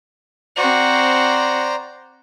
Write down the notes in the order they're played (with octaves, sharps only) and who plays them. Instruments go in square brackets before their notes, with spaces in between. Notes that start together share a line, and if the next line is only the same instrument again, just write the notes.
[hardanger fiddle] C4 F#4 [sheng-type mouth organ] C5 D5 A#5